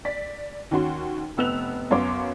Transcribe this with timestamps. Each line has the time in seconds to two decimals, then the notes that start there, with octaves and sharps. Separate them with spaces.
0.05 D5 B6
0.71 D#2 C#4 F#4 C6
1.37 F1 B3 E6 F#6 F7
1.91 F#2 B3 C#5 F5 C6 D6